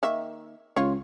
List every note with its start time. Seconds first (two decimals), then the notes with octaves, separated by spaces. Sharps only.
0.03 D#3 A#3 E5
0.76 C#2 F4 C#5